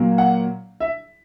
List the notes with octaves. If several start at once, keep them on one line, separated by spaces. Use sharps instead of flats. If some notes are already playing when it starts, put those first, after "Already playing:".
Already playing: A#2 F#3 A#3
F#5
E5